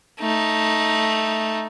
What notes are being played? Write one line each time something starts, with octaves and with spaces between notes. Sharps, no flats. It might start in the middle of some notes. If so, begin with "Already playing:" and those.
A3 D#4